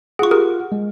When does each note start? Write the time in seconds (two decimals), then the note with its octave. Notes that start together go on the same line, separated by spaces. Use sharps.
0.19 F4 G#4 F#5 C#6
0.31 G4 G#4 A#4
0.72 G#3